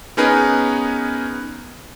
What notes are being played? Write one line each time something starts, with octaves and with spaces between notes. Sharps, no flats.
B3 C#4 D#4 G#4 A#4 B4